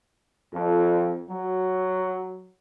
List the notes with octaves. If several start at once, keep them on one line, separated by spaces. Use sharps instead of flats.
F2
F#3